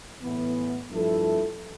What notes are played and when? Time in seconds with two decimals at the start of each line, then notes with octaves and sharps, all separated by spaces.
0.22 A2 E3 B3
0.90 G2 F3 A3 E4 A4